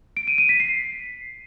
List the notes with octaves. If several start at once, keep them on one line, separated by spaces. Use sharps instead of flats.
D7
D#7
D#7
B6
C7